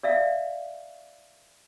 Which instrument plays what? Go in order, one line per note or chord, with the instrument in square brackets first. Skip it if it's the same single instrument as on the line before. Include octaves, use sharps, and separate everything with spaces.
[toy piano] D5 E5 F5